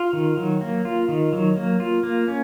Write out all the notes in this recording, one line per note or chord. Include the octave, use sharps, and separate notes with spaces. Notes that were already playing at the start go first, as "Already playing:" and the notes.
Already playing: F4
D#3
F#3
A#3
F4
D#3
F#3
A#3
F4
A#3
C#4